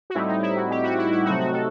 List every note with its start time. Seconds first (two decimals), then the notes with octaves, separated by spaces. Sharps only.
0.10 F#4
0.14 A2 G3 C4 D#4 E4
0.28 D#4
0.43 E4
0.57 F#4
0.71 G4
0.84 F#4
0.98 E4
1.12 E4
1.25 C3 F#3 A3 C4 D#4 F#4
1.40 F#4
1.53 A4